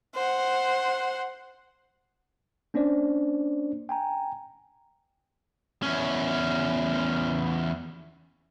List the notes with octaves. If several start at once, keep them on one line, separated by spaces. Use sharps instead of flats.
C5 F#5
A#3 C#4 D4 C5 D5
G5 G#5 A#5
E2 C#4